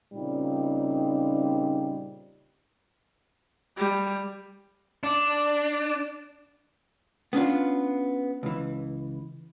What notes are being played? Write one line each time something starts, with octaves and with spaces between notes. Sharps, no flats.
A#2 C#3 G3 C4 D#4
G3
D4
B3 C#4 D4 F4
C#2 E3